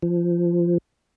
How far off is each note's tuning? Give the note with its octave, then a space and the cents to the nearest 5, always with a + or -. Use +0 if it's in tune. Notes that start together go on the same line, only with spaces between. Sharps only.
F3 -15